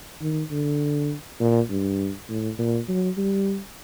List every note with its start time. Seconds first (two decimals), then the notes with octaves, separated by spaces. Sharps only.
0.21 D#3
0.51 D3
1.40 A#2
1.70 G2
2.29 A2
2.59 A#2
2.89 F#3
3.17 G3